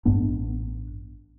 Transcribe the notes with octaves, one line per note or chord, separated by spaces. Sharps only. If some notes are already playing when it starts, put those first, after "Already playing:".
A1 G2 B3 D4